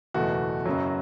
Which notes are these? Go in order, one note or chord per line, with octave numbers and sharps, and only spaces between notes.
F#1 E2 B2 A3 F#4
F#1 F#2 F#3